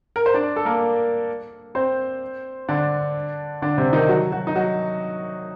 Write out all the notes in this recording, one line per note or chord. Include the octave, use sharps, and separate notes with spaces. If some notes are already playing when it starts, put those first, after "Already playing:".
A#4
C5
D4 D5
A4
A#3 A#4
C4 C5
D3 D4
D3 D4
C3 C4
D#3 D#4
F#3 F#4
F#3 F#4
D#4
F#3 F#4